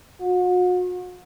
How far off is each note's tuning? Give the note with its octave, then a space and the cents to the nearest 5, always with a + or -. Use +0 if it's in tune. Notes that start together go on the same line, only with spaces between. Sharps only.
F#4 -40